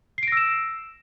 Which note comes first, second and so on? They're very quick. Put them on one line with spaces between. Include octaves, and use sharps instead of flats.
C7 D7 A#6 E6 E7